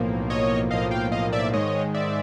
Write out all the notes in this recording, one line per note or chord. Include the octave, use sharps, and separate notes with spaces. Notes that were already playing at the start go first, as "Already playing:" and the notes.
Already playing: B1 A2 F3 A#3
C#5 D#5
B1 A2 F3 A#3 D#5 F5
F5 G5
D#5 F5
D5 E5
G#2 D#3 G#3 C#5 D#5
D5 E5